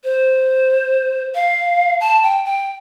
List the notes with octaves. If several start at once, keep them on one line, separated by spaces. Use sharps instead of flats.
C5
F5
A5
G5
G5